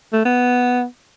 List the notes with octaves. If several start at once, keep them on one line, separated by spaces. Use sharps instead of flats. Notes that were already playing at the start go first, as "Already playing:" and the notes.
A3
B3